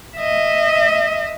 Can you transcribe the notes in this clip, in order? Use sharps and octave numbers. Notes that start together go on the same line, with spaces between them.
D#5 E5